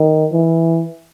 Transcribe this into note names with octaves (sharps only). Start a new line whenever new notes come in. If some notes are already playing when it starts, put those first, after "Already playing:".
Already playing: D#3
E3